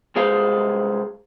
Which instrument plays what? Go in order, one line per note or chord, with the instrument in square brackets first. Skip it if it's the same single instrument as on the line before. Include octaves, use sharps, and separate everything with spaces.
[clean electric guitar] C2 G#3 G#4 C5 F5